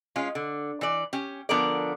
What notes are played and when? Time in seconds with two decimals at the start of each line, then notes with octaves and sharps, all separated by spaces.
0.16 G#3 C#4 F4
0.35 D3
0.81 E3 D5
1.13 C#4 G4
1.49 D3 F3 B3 D4 A#4 D5